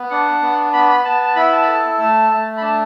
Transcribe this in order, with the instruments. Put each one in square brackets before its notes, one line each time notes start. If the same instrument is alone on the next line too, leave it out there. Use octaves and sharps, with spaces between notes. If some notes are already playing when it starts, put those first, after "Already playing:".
Already playing: [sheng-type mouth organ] B3
D4 F#5
B3
B3 B5
B5
B3 A5
A5
E4 B5
A5
B5
A4 A5
A3 A5
A3
B5
D4 A5